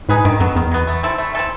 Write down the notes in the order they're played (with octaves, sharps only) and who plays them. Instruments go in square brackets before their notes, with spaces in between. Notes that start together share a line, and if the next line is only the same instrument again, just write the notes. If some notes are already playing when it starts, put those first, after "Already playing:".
[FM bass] G#2 [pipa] D#4 G#4 B4
[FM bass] G2 [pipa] D#3
[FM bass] F2 [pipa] F#3 B3
[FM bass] E2 [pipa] D#3
[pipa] F#3 B3
A3
C4 E4 A4
A3
C4 E4 A4